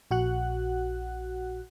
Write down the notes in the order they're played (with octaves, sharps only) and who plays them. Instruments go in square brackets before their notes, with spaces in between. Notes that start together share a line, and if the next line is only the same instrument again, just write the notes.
[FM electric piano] A#1 F#4 F#5 F#6